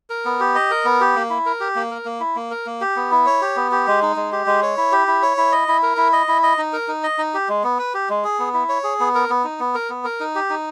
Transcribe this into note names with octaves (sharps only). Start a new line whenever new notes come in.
A#4
B3
G4
D#5
A#4
B3
G4
A#3
E4
A#4
G4
A#3
A#4
A#3
E4
A#3
A#4
A#3
G4
B3
E4
C#5
G4
B3
G4
G#3
D#4
G#3
G4
G#3
C#5
E4
G4
E4
C#5
E4
D#5
E4
A#4
E4
D#5
E4
D#5
D#4
A#4
D#4
D#5
D#4
G4
G#3
B3
B4
G4
G#3
G#4
B3
E4
C#5
G#4
B3
A#4
B3
D#4
B3
A#4
B3
A#4
D#4
G4
D#4